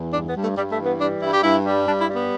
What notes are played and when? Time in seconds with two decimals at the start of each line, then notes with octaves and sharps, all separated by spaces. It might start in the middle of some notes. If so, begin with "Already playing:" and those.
Already playing: E2
0.13 G2 D4
0.29 B3
0.36 G2
0.43 A3
0.57 G2 G3
0.72 A3
0.79 E3
0.86 B3
1.00 G3 D4
1.22 G2 E4
1.33 G4
1.44 G2 E4
1.65 G3
1.86 G2 D4
2.01 E4
2.08 G3
2.15 B3